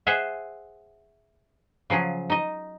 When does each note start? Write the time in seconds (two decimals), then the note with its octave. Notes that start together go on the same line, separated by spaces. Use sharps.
0.07 G#4 C5 E5 F#5 G#5
1.90 C#3 F3 F#3 G#4
2.30 D#4 D#5